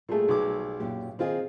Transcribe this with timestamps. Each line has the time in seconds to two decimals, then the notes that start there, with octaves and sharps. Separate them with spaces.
0.09 A#2 G3 A3 G4 G#4
0.28 B1 F#3 D6
0.80 F#2 A#2 G4
1.19 D#3 C4 F4 G#4 D#5